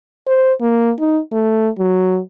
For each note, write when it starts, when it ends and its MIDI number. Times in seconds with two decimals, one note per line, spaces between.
0.27 0.53 72
0.61 0.92 58
1.00 1.20 63
1.32 1.69 57
1.78 2.19 54